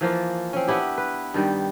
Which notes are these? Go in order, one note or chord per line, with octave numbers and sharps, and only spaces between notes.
E3 F3 A#3 F4
C4 C#4
B3 D4 E4 G4
B4
G2 D#3 G3